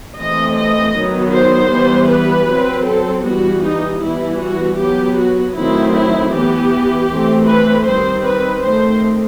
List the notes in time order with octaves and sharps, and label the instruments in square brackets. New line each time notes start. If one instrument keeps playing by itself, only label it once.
[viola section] E3 A3 C4 D#5
D#5
D#3 F#3 B3
C5
E3 G3 B3
B4
F#3 C4
A4
E3 G3 B3 F#4
D#4
E3 G3 B3 E4
F#4
F#3 B3 G4
F#4
D#3 F#3 A3 C4 E4
E4
E3 B3 G4
E3 A3 C4
B4
D#3 G3 C4 C5
B4
D#3 A3 C4 C5